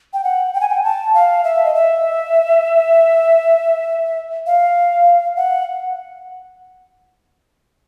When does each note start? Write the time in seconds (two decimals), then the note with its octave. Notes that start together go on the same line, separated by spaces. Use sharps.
0.13 G5
0.24 F#5
0.54 G5
0.61 G#5
0.69 G5
0.84 A5
1.14 F5
1.44 E5
1.65 D#5
1.74 E5
4.46 F5
5.36 F#5